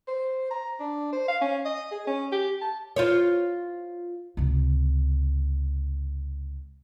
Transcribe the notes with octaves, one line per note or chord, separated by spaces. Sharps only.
C5
A#5
D4
C5
F5
C#4
D#5
G#4
C#4
G4
A5
F4 C5 C#5
C#2 C3